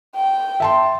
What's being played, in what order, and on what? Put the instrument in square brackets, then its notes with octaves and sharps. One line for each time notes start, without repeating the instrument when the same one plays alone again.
[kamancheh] G5
[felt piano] E5 A5 C6